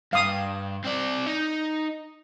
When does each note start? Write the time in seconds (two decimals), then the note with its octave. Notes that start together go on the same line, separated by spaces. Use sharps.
0.13 G2 F5 D#6
0.85 C4 D5
1.27 D#4